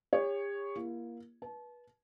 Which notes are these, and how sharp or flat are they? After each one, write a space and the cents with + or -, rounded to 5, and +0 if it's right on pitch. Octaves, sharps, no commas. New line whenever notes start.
G4 +45 C#5 +0
A#3 +20 E4 +45
B4 -25 A5 -30